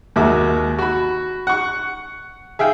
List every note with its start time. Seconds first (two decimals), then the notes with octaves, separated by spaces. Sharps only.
0.16 D#2 D#3 G#3 F#4 E5 D6
0.79 F#4 B5
1.47 F#5 C#6
2.59 G#4 E5 F5 G5